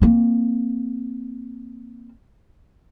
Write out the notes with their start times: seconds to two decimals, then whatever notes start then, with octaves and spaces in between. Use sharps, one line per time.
0.02 A#3 C4